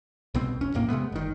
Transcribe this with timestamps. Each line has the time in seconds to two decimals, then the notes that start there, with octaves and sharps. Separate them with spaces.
0.34 C2 B2 C4
0.61 E1 C#4
0.74 A#1 E2 A2 A#3
0.88 C3 G#3 A3 B3
1.12 G1 D#3